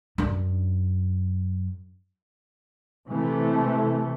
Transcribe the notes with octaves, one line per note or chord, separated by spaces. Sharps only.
F#2 D4
C3 E3 A3